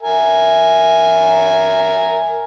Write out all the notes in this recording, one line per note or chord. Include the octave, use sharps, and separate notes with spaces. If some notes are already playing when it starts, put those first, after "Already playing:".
A#4 E5 G#5